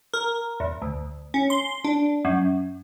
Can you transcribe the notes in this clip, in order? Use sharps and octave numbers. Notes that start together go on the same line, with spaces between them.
A#4
E2
D2
C#4
C6
D4
F#2